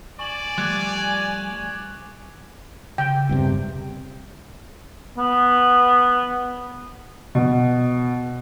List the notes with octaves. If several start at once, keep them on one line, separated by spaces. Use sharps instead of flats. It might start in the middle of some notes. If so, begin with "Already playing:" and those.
D5 G#5 C#6 F#7
F3 G3 A3 D6 F#6 G#6
C#3 G5
E1 G2 C3
B3
B2